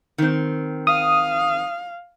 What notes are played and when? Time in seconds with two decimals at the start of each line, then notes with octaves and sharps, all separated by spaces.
0.18 D#3 C4
0.87 F5 D#6